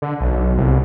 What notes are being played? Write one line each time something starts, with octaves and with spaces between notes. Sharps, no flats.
D3
B1
C2